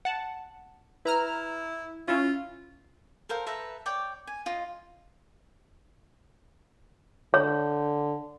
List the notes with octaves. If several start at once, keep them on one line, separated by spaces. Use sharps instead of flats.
F#5 A5
E4 B4 A#5 F6
C#4 E4 F4
A4 A#4 C5 F5
A4 B4 E5 A#5
C#5 D5 G5 D6
G#5
F4 D#5
D3 C#5